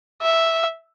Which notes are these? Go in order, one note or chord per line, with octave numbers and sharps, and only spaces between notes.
E5